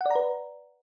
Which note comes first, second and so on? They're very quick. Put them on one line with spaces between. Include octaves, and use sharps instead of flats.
F#5 D5 A#5 B4